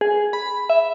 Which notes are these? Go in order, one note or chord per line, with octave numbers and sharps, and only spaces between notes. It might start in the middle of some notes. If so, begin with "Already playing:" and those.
G#4
B5
E5